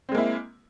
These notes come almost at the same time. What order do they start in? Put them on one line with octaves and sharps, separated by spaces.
C4 G#3 A#3 E4